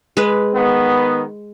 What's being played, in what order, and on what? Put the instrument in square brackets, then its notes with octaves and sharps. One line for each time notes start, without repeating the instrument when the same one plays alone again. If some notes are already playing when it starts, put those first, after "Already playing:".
[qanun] G#3 B4
[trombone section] D#3 B3